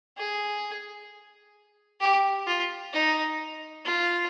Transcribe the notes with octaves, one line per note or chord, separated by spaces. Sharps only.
G#4
G4
F4
D#4
F4